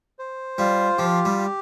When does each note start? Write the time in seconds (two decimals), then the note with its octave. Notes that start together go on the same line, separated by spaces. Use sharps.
0.19 C5
0.58 G3 F4
0.98 F3 G4
1.25 G3
1.38 G4